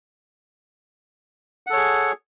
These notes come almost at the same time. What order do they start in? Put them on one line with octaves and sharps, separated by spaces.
F#5 A4 C#5 G#4